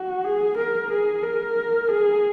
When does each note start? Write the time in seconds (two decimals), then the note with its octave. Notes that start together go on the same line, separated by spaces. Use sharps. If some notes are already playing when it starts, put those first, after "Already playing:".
Already playing: F#4
0.24 G#4
0.57 A#4
0.90 G#4
1.23 A#4
1.88 G#4